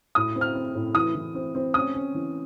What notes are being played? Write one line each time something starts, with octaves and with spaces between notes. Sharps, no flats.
A2 D#6
C4
F6
C4
A2
E3 D#6
E3
C4
C4
C#4 D#6
C#4
E3